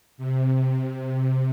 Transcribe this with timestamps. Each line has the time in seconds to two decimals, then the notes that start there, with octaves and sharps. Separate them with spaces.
0.17 C3